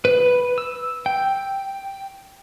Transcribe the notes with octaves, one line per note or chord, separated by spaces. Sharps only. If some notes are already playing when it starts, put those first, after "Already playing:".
B4
E6
G5